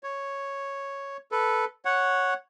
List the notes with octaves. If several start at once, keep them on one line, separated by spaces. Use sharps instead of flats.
C#5
A4 B4
C#5 F#5